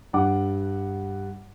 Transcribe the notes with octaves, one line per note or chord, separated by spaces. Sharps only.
G2 D4 F#5 D6